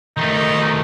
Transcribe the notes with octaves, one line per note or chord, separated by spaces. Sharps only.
D#3 A3 D#4